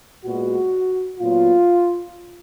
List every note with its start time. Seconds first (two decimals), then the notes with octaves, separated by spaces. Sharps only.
0.24 A#2 G#3 B3 F#4
1.19 A#2 F#3 B3 F4